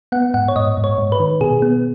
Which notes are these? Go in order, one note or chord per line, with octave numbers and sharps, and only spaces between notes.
B3 F#5
G#2 F#5
C#5
G#2 D#5
G#2
C#5
G#2
B4
D#3
B2 G#4
B3